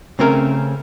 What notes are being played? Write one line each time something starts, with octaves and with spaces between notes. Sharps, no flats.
C#3 A3 C4 C#4 A#4